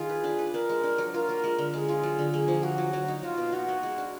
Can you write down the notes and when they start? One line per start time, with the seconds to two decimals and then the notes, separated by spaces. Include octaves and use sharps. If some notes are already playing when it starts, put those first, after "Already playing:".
Already playing: D#3 F4 G#4
0.09 B4
0.24 D4
0.39 B4
0.53 D4 A#4
0.69 G#3
0.83 D4
0.98 F#3
1.14 F4 A#4
1.29 A#3
1.44 G#3
1.59 D3
1.73 G#3 G#4
1.89 F4
2.03 F#3
2.19 D3
2.33 A#3 G#4
2.48 F3
2.63 A#3 F#4
2.78 F#3
2.93 F#3
3.08 D#4
3.23 F#3 F4
3.38 B2
3.52 D#4 F#4
3.68 A#3
3.83 G#3
3.98 D4